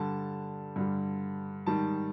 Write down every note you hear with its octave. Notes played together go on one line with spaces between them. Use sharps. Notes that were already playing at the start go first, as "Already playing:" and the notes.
Already playing: G2 D3 G3 A5
G2 D3 G3
G#2 D#3 G3 A5